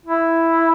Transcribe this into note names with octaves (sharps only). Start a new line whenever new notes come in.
E4